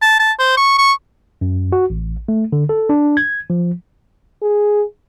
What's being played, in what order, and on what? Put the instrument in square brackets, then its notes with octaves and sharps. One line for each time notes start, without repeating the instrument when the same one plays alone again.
[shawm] A5
A5
C5
C#6
C#6
[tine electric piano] F#2
F#4
A1
A3
D3
A4
D4
G#6
F3
[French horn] G#4